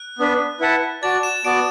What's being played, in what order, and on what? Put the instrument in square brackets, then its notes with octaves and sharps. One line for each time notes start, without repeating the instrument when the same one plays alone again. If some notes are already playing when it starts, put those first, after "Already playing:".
Already playing: [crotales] F#6
[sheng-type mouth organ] B3 D4 B4
E4 B4 F#5 A5
[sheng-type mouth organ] F#4 D5 A5 [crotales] A6
[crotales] E7
[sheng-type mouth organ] B3 F#4 D5 A5 [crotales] D7